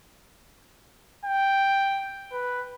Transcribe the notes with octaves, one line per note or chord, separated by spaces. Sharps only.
G5
B4